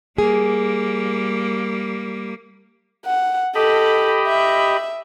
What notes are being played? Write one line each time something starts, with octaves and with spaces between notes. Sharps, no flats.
G3 A#3 G#4
F#5
G4 A4 D#5 B5
E5